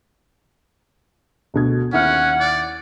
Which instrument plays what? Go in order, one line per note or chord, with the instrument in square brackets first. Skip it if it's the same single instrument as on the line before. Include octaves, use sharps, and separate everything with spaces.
[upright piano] D2 B2 G#6
[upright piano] D#2 E4 F6 [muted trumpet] C#4 [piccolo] F#5
[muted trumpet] D5